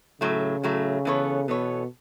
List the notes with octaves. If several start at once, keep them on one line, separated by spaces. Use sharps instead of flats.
A2 C#3 F#3 A3
A2 F#3 A3
E3 B3 A4 C#5
B2 E3 B3 A4 C#5